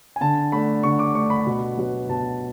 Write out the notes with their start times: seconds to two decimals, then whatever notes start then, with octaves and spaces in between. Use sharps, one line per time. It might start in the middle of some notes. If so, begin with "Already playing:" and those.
0.16 G#5
0.21 D3 A5
0.52 A3 D4 B5
0.83 D3 C#6
0.99 D6
1.15 A3 D4 C#6
1.30 B5
1.46 B2
1.77 F#3 B3
2.09 B2 A5